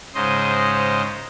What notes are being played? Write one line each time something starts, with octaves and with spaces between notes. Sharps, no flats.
G#2 C#3 C5 D#5